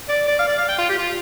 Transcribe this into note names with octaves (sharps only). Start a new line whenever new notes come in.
D5
D5
F5
D5
F5
G5
F4
G4
F4